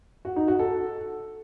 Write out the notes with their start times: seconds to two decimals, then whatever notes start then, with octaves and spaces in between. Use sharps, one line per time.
0.25 F#4
0.36 D#4
0.48 F#4
0.59 A4